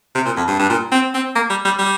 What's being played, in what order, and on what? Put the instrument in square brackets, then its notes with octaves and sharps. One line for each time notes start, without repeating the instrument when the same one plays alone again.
[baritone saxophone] C3
A#2
F2
G2
G2
A#2
C4
C4
A#3
G3
G3
G3